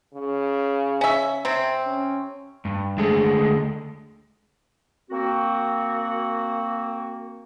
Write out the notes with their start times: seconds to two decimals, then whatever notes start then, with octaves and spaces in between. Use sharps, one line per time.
0.14 C#3
1.01 C#4 E5
1.45 C3 C4
1.87 C#4
2.65 G2
2.98 D2 D3 G#3
5.10 A#3 C4 F#4